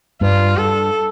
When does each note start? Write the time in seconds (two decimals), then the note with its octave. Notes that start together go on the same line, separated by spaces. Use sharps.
0.21 G2 F4
0.57 G2 A4